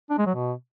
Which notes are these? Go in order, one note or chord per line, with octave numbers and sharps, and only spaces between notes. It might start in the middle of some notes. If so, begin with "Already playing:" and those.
D4
G#3
F#3
B2